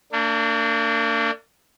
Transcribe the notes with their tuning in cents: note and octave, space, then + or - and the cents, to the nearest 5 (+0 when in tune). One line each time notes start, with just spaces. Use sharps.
A#3 -40 D4 +0